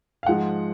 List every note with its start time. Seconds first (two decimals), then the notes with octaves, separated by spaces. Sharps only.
0.23 F5
0.26 G#2 F3 G#3 F#5